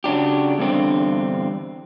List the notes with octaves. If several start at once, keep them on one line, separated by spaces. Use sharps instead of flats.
C#3 F#3 D4 G4
E2 G2 D3 C4